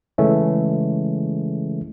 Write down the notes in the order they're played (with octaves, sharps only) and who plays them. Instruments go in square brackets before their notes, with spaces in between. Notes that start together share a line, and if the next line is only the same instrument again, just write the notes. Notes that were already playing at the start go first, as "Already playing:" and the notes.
[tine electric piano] C#3 E3 G#3 A3 C#4